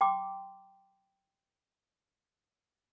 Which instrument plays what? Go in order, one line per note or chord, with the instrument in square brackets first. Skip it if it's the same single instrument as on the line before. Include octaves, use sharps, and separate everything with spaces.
[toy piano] G5 A#5 C6 D6